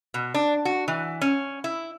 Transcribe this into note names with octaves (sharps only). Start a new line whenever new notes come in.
B2
D4
F#4
E3
C#4
E4